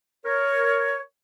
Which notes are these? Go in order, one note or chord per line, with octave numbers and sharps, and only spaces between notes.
A#4 C#5